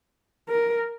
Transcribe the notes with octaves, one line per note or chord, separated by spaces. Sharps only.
A#4